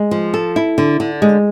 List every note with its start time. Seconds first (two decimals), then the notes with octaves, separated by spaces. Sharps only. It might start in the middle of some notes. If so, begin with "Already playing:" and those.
Already playing: G#3
0.11 F3
0.34 A4
0.56 E4
0.78 D3
1.00 D3
1.22 G#3